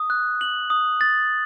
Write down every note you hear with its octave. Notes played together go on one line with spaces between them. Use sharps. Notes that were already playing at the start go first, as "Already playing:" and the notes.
Already playing: D#6
F#6
F#7
D#6
A6